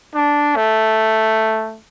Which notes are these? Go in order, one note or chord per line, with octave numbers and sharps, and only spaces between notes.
D4
A3